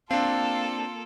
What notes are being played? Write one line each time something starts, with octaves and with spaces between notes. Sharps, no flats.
A#3 C4 D4 F4 A4 F5 A5